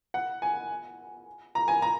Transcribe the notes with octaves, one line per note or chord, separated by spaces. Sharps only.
F#5
G#5
A#5
G#5
A#5